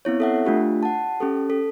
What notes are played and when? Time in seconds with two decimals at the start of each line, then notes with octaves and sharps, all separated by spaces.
0.05 B3 C4 E4 C#5
0.20 A4 E5 F#5
0.46 A3 D4 F4 G4
0.83 F#5 A5
1.20 C#4 G4 A4
1.50 A4